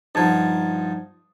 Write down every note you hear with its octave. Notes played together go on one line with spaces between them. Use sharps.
G2 F3 D#4 F#5 A5 G#6 A6